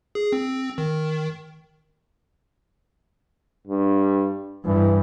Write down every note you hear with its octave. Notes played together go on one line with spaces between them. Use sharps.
G#4
C4
D#3
G2
G2 E3